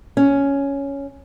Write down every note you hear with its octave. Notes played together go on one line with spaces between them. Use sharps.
C#4